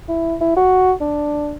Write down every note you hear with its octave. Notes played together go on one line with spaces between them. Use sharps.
E4
E4
F#4
D4